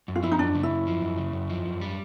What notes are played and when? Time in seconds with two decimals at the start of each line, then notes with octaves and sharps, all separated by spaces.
0.08 F#2
0.16 F4
0.23 F3 E4
0.32 D#4
0.39 F#2 D4
0.55 C#3
0.63 E4
0.70 F#2
0.87 F3
1.02 F#2
1.18 C#3
1.33 F#2
1.49 F3
1.66 F#2
1.81 G3